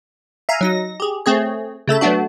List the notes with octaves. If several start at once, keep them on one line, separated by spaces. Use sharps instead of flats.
E5 F5 G#5 A#5
F#3 D#4 A#6
G4 G#4
A3 C4 G#4 C#5
C#3 A3 A4 E5
F#3 A3 B3 D4 F#4